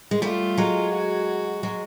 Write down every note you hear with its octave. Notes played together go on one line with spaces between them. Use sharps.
G#3
G3 A3 F4
F#3 G#3
F#4
F#3 G#3